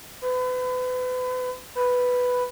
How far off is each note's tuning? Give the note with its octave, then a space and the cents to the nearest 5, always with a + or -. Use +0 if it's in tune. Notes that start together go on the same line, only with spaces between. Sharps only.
B4 +35
B4 +5